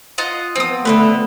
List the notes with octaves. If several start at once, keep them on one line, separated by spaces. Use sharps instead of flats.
F4 D#5 F#5
F3 B3 C4 D#6
D3 A3 A4 B4